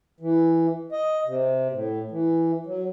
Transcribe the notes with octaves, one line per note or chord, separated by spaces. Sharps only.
E3
D#5
C3
A2
E3
F#3